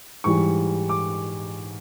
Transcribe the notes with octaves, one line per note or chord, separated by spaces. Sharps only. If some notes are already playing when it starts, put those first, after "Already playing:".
G#2 E3 G3 C#6
D6